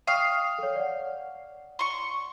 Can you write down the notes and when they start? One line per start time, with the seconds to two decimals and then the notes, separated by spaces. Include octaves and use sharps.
0.07 F5 G5 C#6 D#6
0.58 A4 C#5
0.76 D5 F#5
1.79 C6 C#6